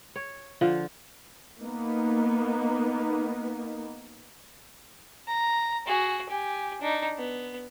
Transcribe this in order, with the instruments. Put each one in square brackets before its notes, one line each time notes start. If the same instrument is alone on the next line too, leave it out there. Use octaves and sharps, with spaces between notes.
[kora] C#5
D3 F3 F4
[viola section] A#3 B3 D#4
[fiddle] A#5
F#4 G#4
G4 G#5
D4 D#4
B3